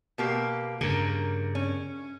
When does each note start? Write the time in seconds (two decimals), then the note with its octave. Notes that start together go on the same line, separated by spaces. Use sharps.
0.18 B2 A#3 G4
0.81 G2 C#3 A#3 A#4
1.55 C#4